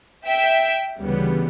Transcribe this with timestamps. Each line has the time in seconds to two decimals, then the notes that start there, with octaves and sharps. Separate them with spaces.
0.27 E5 G5
1.00 D2 C#3 E3 G3 B3